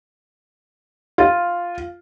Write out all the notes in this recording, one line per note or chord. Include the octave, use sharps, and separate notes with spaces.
F4